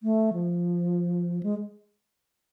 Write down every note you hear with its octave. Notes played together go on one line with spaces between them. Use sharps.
A3
F3
G#3